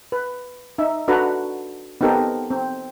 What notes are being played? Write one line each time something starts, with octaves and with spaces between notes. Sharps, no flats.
B4
D#4 E5
D4 F#4 A4 B4 A#5
B3 C4 D#4 G4 A4 A#4
C4